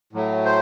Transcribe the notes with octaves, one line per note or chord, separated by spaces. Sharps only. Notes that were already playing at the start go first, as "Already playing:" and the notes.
A2 F#3 A3
C5